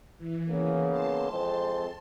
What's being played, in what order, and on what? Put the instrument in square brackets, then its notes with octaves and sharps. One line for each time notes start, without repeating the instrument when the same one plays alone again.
[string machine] E3
[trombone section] C#3 A#3 B3
[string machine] A5 C6
[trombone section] F2 G#3 C4